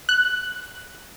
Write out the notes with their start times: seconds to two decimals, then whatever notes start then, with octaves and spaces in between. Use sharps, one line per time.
0.09 F#6